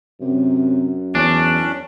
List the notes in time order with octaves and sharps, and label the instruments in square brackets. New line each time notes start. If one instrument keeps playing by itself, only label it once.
[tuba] F#2 [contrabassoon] C3
[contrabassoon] E2 [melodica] C#4 [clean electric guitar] D4